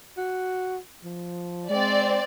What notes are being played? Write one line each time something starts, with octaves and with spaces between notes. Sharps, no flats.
F#4
F3
G#3 C4 D5